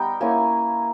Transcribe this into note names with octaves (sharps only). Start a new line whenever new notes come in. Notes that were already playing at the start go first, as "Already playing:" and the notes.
Already playing: G3 B3 D#4 G5
A#3 C#4 E4 G#5